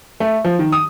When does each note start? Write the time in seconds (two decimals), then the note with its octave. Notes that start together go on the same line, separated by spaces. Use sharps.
0.20 A3
0.45 F3
0.59 D#3
0.72 D#6